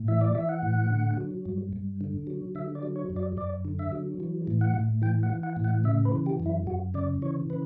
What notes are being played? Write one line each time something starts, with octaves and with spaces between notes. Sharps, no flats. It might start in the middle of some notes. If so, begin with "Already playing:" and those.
Already playing: A2
E3 E5
D5
E3 E5
F#5
A2
D3
F#3
G2
G2
D3
F#3
D3 E5
D5
F#3
C#5
F#2
D5
F#2 D5
D3
E5
F#3
E3
A2
F#5
A2
E3 G5
F#5
E3
F#5
A2
F#5
C#3 E5
B4
E3
G4
F#2
E4
F#2 F#4
C#3 D5
E3 C#5
C#3 B4